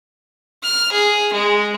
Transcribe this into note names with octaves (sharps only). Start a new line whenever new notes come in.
F6
G#4
G#3